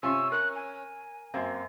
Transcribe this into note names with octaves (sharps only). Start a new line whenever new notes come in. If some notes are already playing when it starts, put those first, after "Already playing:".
C3 C#4 F4 C6 E6
A#4 F#6
G#5
F#2 A#3 C4